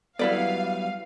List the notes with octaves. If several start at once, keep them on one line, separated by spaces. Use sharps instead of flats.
F#3 G3 B3 E4 B4 D5 F5